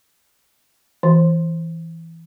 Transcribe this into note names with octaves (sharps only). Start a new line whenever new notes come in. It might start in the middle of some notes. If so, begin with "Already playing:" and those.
E3